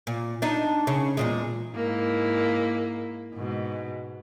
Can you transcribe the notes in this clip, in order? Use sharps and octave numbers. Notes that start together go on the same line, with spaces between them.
A#2
D4 D#4
C#3
E2 A#2 G#3
G#2 A#3 E4
G#2 B2